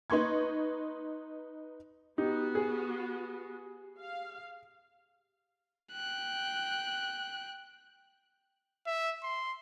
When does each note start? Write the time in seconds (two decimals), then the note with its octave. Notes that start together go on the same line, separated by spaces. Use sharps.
0.10 D#4 B4 C6 C#6 G#6
2.18 B3 D#4 F#4 G4
2.55 G#4
4.00 F5
5.92 G5 F#6
8.86 E5
9.23 C6